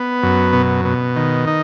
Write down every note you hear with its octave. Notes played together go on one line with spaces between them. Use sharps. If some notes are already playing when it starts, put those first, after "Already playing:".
Already playing: B3
F#2
B2
B2
D#3
D#4